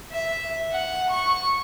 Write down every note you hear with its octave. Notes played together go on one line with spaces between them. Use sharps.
E5
F#5
C#6